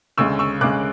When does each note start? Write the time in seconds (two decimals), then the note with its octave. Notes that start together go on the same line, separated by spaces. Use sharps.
0.18 D2 C#3 G#3 C#6 E6
0.39 C#6 E6
0.61 D2 C#3 G#3 D6 F#6